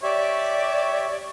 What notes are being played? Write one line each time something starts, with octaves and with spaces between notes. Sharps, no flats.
G4 C#5 D5 E5